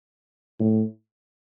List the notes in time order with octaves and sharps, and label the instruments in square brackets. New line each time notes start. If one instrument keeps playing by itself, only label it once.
[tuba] A2